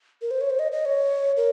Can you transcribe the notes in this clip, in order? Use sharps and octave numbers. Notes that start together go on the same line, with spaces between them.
A#4
C5
C#5
C5
D#5
D#5
C#5
A#4